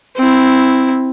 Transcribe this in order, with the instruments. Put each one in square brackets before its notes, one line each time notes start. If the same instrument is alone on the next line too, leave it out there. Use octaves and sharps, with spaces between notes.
[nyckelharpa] C4 E4